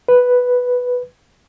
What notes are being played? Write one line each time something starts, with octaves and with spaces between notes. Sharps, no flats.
B4